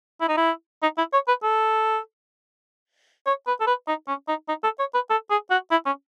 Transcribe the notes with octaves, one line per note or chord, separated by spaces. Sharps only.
E4
D#4
E4
D#4
E4
C#5
B4
A4
C#5
B4
A4
B4
D#4
C#4
D#4
D#4
A4
C#5
B4
A4
G#4
F#4
E4
C#4